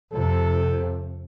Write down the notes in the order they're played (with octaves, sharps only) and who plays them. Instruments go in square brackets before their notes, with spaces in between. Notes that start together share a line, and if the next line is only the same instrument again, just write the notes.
[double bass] F2 C3 [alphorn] A4